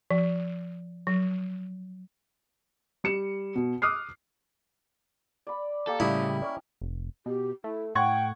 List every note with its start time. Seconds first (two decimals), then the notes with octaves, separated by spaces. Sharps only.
0.11 F3
1.07 F#3
3.04 G3 C#7 E7
3.55 B2
3.82 D6 D#6 F6 F#6 C7
5.47 D5 B5
5.87 A#3 G4 A4
6.00 A2 C#3 G3 E4 D#5 A#5
6.42 C#4 A#4 D5
6.81 F1
7.26 B2 G4
7.64 A3 E4
7.95 A2 F#5 G5 C#6 G#6